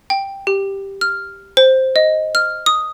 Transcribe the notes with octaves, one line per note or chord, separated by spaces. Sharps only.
G5
G4
F6
C5
D#5
F6
D#6